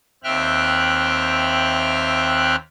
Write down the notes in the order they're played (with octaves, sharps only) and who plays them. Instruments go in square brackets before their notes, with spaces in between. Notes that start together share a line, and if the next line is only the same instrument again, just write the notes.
[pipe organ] D#2 C4 E5 G5 F6 F#6